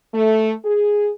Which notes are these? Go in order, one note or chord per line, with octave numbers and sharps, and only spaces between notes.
A3
G#4